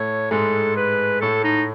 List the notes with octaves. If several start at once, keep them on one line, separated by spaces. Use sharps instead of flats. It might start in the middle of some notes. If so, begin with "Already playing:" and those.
Already playing: A2 A3 C#5
G#2 G#3 A4
B4
A2 A3 A4
D#4